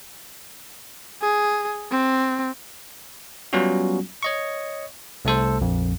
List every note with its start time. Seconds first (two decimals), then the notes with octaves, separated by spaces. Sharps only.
1.22 G#4
1.92 C4
3.53 F#3 G3 B3 C#4 F4 F#4
4.23 C#5 D#5 C#6
5.25 C2 A3 A4 C5
5.61 A#1 F2